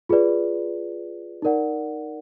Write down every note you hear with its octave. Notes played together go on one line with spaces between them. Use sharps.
F4 G#4 B4 D5
D#4 A#4 D5 F#5